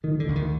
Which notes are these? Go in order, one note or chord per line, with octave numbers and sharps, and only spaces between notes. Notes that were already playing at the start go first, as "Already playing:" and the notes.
D2 D#3
D3
D2
D#3